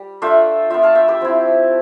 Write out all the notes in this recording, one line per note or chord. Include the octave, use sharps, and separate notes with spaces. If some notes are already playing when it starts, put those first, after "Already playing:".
Already playing: G3
A3 D4 F4 E5 G5
B3 F4 E5 G5
F5 A5
E5 G5
G4 B4
F3 C4 E4